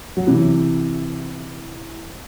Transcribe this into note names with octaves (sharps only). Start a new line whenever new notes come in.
F#3
C3 E3